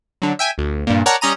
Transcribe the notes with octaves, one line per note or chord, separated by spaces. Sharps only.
D3 F#3
E5 G5 G#5
D2
G2 A#2
A#4 C#5 D5 F#5 A5 A#5
G3 C#4 D#5 A#5 D#7